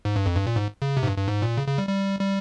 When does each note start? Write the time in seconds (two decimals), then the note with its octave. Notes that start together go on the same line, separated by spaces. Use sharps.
0.05 G#2
0.16 G2
0.26 F2
0.35 G2
0.46 A#2
0.56 G#2
0.82 C#3
0.97 C3
1.03 G#2
1.07 G2
1.17 G2
1.28 G#2
1.42 A#2
1.57 C#3
1.68 C#3
1.78 G3
1.88 G3
2.20 G3